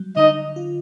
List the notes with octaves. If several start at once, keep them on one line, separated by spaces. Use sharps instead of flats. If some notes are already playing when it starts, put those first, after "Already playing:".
Already playing: F#3 G3
D3 D#4 D#5
F4